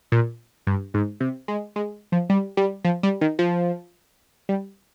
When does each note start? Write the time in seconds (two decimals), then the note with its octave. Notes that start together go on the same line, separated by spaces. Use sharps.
0.12 A#2
0.67 G2
0.94 G#2
1.21 C3
1.48 G#3
1.76 G#3
2.12 F3
2.30 G3
2.57 G3
2.85 F3
3.03 G3
3.21 D#3
3.39 F3
4.49 G3